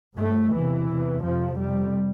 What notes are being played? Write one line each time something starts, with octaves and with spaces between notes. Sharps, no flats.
G2 A3
E2 C3 E3
E2 C3
F2 C3 F3
F2 C3 G3